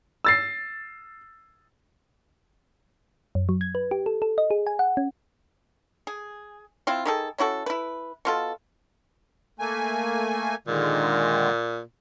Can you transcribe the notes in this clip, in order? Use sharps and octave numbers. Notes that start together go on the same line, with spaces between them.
E6 A6 C7
F#2
F#3
G#6
B4
G4
A4
A4
D#5
G#4
G#5
F#5
C#4
G#4
C4 E4 F4
D#3 G#4 A4
C#4 E4 F#4 A4
E4 B4
B2 F4 A4
A3 A#3 G#5
A#2 D3 D#3 G#3